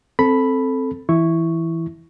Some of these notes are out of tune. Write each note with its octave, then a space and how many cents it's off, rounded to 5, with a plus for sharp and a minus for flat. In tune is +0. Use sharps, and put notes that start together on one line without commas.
C4 +0 A4 +0 B5 +0
E3 +0 E4 +0 C#6 +0